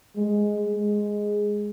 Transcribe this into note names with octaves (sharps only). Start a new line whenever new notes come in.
G#3
G#3